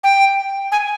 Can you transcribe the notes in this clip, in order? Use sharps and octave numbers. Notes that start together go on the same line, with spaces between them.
G5
G#5